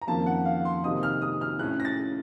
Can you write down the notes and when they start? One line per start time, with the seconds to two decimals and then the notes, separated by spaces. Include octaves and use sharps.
0.02 A#5
0.07 F2 D#3 A#3 C#4 A5
0.26 F#5
0.45 F5
0.65 C6
0.84 C3 D#3 A#3 D#4 D#6
1.03 F6
1.22 D#6
1.41 F6
1.59 A2 A3 C#4 F#6
1.80 A#6
1.85 A6